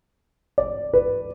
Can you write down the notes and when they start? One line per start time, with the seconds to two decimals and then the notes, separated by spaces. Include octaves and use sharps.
0.58 D5
0.94 B4